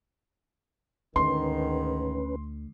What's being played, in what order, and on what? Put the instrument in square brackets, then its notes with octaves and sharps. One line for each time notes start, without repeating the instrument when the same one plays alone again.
[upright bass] D2 [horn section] G#2 D#3 [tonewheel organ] C#4 B4 [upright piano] C6